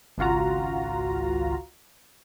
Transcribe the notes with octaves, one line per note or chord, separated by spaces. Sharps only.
G#1 C#2 F4 F#4 A#5